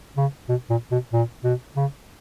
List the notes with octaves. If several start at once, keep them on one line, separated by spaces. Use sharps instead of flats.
C#3
B2
A#2
B2
A#2
B2
C#3